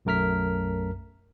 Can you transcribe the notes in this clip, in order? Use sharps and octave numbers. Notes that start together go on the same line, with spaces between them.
B1 F#2 A3 A#4 F6 B6